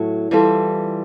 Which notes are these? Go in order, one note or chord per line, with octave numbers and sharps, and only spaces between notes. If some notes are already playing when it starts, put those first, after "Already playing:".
Already playing: A2 F#3 A3
E3 G3 C4 F4 A4